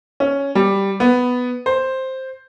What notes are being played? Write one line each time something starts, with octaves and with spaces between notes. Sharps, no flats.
C#4
G3
B3
C5